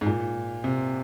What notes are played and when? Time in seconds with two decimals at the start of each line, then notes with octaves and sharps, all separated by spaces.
0.01 G#2
0.06 A#2
0.64 C3